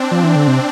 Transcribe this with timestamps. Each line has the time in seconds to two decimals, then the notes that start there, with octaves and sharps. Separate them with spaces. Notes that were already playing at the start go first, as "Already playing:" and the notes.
Already playing: C4 D4
0.11 F3
0.23 E3
0.36 D3
0.47 C3